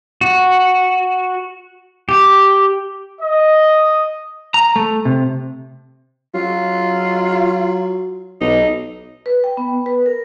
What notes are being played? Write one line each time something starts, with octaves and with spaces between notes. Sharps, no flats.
F#4
G4
D#5
A#5
A3
C3
F#3 F4
B1 D#4
B4
G5
B3
B4
A#4